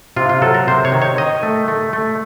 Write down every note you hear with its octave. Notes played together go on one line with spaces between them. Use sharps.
C3 F4
F4
F#3 A4
A#4
C3 C5
C#5
D#3
C#5
D#3 D#5
A3
A3
A3